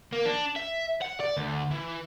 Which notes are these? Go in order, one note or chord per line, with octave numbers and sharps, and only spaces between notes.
A#3
D4
E5
F#5
D5
D2
E3